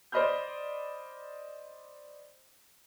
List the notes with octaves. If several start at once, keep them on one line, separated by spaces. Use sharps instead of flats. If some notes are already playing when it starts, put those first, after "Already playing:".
C5 D5 D#5 B5 F6 G6